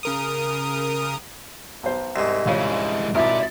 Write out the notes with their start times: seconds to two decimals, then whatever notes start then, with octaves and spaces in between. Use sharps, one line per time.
0.03 C#3 A#4 D#6
1.83 B1 C5
2.16 C2 G#2
2.47 C#3 G#3 C#4 E4 F4
3.15 G#1 E4 A#4 D5 E5